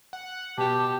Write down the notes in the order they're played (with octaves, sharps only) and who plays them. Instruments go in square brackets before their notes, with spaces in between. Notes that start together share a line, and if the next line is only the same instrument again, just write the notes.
[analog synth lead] F#5
[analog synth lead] B2 [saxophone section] G4 [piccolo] A5